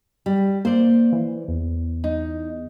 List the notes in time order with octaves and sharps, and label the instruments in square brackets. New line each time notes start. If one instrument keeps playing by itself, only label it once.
[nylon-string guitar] G3
[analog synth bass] A#3 [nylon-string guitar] C5 D5
[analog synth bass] E3
E2
[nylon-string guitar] D#4